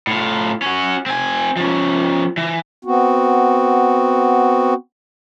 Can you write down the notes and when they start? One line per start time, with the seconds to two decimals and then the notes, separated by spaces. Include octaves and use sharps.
0.07 A2 F4
0.62 C#4 F#4
1.06 C4 G#5
1.57 F3 C#4
2.37 E3
2.85 B3 C4 F#4